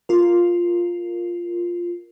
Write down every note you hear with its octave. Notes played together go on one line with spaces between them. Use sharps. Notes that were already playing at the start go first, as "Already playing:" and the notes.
F4 A#4